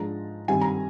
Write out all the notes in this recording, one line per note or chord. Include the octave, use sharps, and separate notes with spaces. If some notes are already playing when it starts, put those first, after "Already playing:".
Already playing: G#2 F3 G#3 D4 A#5
G2 D#3 G3 C4 G#5
A#5